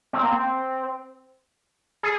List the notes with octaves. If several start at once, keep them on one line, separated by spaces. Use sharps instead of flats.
C4
A#3
C4
G#4